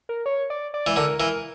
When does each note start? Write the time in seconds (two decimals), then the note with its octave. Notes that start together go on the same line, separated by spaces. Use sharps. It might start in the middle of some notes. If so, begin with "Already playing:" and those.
0.09 A#4
0.26 C#5
0.50 D5
0.74 D5
0.87 E3
0.96 D3 A#4
1.20 E3 A#4